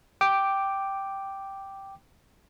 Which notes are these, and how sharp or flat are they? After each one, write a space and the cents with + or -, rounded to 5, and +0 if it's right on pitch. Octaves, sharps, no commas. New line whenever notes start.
G5 -5 D6 +0